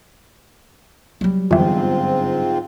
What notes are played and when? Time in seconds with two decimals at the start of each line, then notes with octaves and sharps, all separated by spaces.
1.21 F#3 G3
1.51 G1 F2 G#2 E3 C4 F4